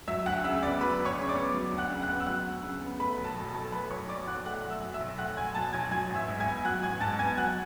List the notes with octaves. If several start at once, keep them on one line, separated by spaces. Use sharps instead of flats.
F#3 E5 E6
D2 F#5 F#6
C#3 E5 E6
B3 D5 D6
F#3 B4 B5
D2
C#5 C#6
C#3
D5 D6
B3
F#3
D2
F#5 F#6
C#3
F#5 F#6
B3
E6
F#3 F#5 F#6
D2
C#3
B3
A3 B4 B5
B1
A4 A5
B2
A4 A5
B1
A3 B4 B5
B1 C#5 C#6
B2 D5 D6
B1 F#5 F#6
A3 F#5 F#6
B1
E5 E6
B2
E5 E6
B1
A3 F#5 F#6
B1 G#5 G#6
B2 A5 A6
B1 G#5 G#6
F#3 G#5 G#6
A1
E5 E6
G#2
G#5 G#6
B3
F#3 F#5 F#6
A1 G#5 G#6
G#2 A5 A6
B3 G#5 G#6
F#3 F#5 F#6